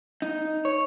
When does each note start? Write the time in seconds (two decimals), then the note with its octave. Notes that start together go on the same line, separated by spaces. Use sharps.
0.22 D#4
0.65 C#5